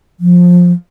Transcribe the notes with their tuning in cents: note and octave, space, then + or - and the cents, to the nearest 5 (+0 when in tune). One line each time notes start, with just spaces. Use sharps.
F3 +20